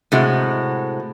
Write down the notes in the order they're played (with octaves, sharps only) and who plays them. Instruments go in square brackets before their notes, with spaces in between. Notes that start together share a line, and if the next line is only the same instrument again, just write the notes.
[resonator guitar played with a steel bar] A2 C3 G#3 F#4